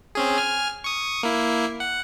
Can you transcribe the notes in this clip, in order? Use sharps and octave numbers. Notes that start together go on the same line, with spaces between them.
C4 C#4 G#4
G#5 F6
C#6 D#6
A#3 E4
F#5